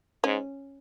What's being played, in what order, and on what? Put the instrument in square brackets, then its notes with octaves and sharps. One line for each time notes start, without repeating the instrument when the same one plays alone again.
[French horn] G#2 [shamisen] C#4